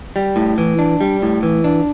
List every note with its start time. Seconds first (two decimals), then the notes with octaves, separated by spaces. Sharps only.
0.16 G3
0.36 A2
0.58 E3
0.79 D4
1.01 G3
1.22 A2
1.43 E3
1.64 D4